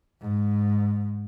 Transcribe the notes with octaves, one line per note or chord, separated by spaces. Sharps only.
G#2